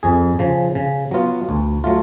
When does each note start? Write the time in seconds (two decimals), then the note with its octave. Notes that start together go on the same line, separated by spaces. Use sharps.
0.03 F2 G#4
0.39 C#3 F3
0.75 C#3
1.11 F#3 B3 F4
1.49 D2
1.84 F#3 A3 F4